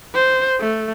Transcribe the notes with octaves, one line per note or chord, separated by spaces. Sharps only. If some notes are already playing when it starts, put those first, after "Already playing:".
C5
A3